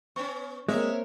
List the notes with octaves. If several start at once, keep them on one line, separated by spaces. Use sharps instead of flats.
B3 C#4 C#6
G#3 A#3 C4 C#4 A#4 C#5 E5